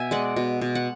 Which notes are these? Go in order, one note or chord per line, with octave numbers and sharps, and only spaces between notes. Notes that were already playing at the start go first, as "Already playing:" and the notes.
Already playing: B2 E5 G#5
G#3 D5 F#5
B2
B2
F#5